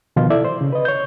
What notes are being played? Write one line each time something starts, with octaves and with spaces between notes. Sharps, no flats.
B2 D3 D#3 F3 D#4 F4
E4 A4 D5 E5
C5
C#3
B4 D#5
C#5 G6